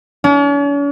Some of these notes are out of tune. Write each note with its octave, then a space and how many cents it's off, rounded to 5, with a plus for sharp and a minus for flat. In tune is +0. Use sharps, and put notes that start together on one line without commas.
C#4 +45